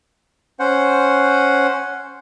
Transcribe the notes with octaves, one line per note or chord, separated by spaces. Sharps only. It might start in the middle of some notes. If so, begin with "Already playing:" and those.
C#4 C5 F#5